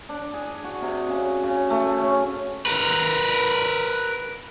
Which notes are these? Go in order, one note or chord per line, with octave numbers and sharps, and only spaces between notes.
D4
G#4
F#4
C3
C#3
C#3
A3
C#4
A#4 B4